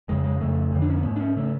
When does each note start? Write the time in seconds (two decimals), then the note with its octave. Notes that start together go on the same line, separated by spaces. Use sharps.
0.08 F2 C#3 G#3
0.24 G#3
0.41 F2 C#3 A3
0.72 F2 D3
0.82 D4
0.90 C#4
0.96 B3
1.04 G#2 A3
1.16 D4
1.20 C#4
1.36 C#3 A3